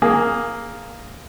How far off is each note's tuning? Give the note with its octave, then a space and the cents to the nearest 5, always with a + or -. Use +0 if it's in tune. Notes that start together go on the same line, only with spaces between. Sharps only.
A#3 +0 G#4 +0